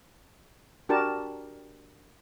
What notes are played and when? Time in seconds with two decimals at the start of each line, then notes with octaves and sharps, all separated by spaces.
0.89 D4 F#4 G4 A#4 A5